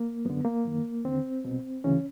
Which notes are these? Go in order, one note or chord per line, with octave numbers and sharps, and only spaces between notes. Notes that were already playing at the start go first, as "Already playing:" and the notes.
Already playing: A#3
F#2 D3 B3
A#3
F#2 D#3
D#2 D3 C4
C2 B2
D2 C#3 E3 C#4